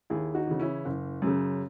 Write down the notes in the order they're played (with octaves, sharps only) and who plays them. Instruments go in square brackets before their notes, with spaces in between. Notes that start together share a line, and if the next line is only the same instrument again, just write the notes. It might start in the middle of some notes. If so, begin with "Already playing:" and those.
[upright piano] D#2 E4 G#4
D#4 F#4
C#3 E3
C#4 E4
F#1
F#2 C#3